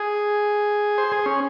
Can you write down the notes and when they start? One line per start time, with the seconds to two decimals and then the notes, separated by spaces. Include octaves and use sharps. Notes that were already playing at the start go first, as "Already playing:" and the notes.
Already playing: G#4
0.98 C5
1.12 G#4
1.26 C#4